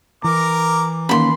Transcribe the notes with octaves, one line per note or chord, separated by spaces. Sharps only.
E3 A#4 A#5 D6
D#3 A#3 C#4 B5 C6